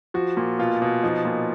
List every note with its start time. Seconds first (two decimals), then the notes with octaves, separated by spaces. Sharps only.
0.14 F3 F#4
0.37 A#2
0.59 B2 F4
0.82 B2
1.03 F3 D#4
1.25 A#2